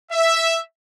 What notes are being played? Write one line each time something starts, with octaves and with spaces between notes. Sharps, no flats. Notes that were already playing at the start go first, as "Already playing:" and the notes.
E5